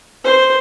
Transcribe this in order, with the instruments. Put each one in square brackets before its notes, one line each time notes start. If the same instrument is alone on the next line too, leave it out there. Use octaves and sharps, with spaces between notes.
[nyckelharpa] C5